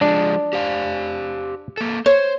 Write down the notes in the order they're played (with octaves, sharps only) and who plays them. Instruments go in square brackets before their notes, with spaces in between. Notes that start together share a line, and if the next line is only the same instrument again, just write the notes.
[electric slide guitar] F3 G#3 [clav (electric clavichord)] D4 D5
[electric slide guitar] G4 C5 F5
A#3 A4
[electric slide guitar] C5 [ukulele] C#5